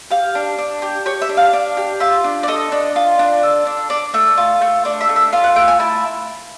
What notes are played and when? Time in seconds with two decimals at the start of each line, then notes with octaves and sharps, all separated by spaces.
0.10 G4 F5
0.35 D4
0.58 D4
0.82 G4
1.06 G4 C#5
1.22 E5
1.29 D4
1.37 F5
1.53 D4
1.77 G4
2.00 F4 E5
2.24 D4
2.43 D5
2.48 A4 D#5
2.72 D4
2.96 F4
3.19 D4
3.43 A4
3.67 D4
3.90 D4 D5
4.14 A3
4.37 F4
4.61 A3
4.85 D4 D5
5.01 E5
5.09 A3
5.16 E5
5.33 F4 F5
5.44 F#5
5.56 A3 G5
5.68 G#5
5.80 E4 A5